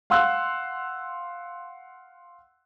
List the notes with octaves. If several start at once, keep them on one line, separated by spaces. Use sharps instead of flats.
F5 F#5 C6 E6 F#6